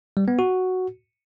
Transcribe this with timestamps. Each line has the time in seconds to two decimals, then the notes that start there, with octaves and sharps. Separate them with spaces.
0.17 G3
0.28 B3
0.39 F#4